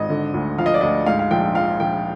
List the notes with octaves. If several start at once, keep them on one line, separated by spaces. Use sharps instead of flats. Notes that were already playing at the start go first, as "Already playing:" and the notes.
Already playing: G#1 D#5
D3
D2
F3 F5
D#5
D5
D2 D#5
G#2 F5
F5
A#1 G5
F3 F5
A#1 G5